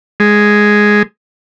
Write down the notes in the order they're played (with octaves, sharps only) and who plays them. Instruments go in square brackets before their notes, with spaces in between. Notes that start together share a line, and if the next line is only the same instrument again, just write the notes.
[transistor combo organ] G#3